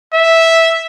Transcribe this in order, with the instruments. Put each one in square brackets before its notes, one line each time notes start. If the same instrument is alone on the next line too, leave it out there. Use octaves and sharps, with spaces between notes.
[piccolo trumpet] E5